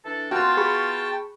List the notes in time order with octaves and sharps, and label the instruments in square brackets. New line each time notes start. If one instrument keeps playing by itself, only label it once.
[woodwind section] E3 D4 A4
[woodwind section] B3 F4 [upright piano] F#4 C6 [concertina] G5 A5
[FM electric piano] G#4 B5 C#6